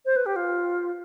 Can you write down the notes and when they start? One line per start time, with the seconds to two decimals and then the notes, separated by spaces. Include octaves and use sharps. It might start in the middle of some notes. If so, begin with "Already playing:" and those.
0.06 C5
0.16 B4
0.26 G4
0.36 F4